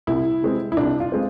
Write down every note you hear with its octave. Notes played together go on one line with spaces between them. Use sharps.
C2 E4
C3 G#3 C4
E4
C2 D4
F4
G#3 C4